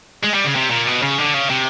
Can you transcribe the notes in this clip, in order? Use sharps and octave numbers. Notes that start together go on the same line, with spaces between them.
G#3
G3
C#3
C3
A#2
B2
C#3
D3
C#3
C3